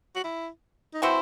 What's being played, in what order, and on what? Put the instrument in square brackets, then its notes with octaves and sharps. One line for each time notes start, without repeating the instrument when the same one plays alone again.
[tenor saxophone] F#4
E4
D#4
[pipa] E3 C4 F#4 C5 [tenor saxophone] E4